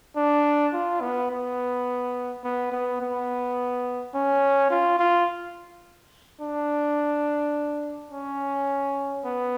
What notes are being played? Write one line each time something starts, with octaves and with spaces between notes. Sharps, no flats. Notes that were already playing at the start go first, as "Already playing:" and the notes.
D4
F4
B3
B3
B3
B3
B3
C#4
F4
F4
D4
C#4
B3